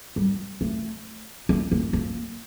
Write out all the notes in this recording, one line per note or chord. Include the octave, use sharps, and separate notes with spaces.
G3
A3
A#3
A#3
A#3